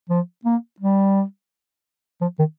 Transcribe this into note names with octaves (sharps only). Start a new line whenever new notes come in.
F3
A#3
G3
F3
D#3